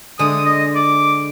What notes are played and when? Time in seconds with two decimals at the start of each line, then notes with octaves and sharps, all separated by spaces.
0.19 D3 G#3 D#6
0.45 D#5
0.75 D6